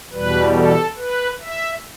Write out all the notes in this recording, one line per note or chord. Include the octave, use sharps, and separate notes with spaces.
E2 B2 G3 B4
A4
B4
E5